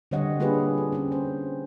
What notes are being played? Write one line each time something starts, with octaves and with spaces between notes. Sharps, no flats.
D3 G3 C4 C#5 D#5 F#5
A#3 D4 F4 G4 G#4 B4
A4
C4 C#4
C5